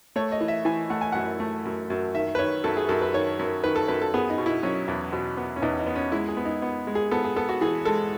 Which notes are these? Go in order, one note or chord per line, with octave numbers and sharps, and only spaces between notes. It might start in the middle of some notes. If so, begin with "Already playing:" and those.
A3 C#5
D#5
E3
E5
E3 G#5
A3 F#5
G#5
F#2 F#5
A3
F#2
F#2
D#3 E5
B4
D#3 C#5
F#2 A4
G#4
F#2 A4
B4
D#3 C#5
F#2
D#3 B4
A4
F#2 B4
A4
B3 G#4
D#4
B2
E4
F#3 C#4
E2
B2
B3
C#4
E2 D#4
D#4
B3
C#4
G#3 E4
G#4
B3
D#4
B3
G#3
G#4
B3 A4
G#4
B3 A4
F#4
E3 G#4
G#3 A4